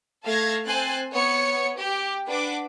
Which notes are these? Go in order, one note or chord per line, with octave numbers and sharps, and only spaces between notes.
A3 F5 A5 G#6 A#6
C4 C5 G#5 F#6 A6
B3 C#5 C#7
G4
D4 B4 F#5 D6